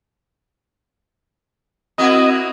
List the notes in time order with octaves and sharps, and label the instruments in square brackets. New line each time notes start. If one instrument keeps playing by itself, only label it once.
[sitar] A#3 E4 F#4 [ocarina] C4 [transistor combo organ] D#5